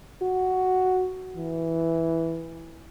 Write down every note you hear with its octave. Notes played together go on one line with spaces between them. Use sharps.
F#4
E3